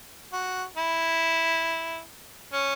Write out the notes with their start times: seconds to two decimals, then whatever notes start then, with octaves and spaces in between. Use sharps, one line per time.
0.33 F#4
0.77 E4
2.53 C#4